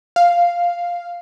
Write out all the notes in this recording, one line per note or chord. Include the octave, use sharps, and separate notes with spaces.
F5